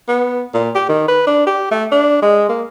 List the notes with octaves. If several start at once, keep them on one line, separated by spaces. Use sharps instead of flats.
B3
A#2
G4
D#3
B4
D4
G4
A3
D4
G#3
A#3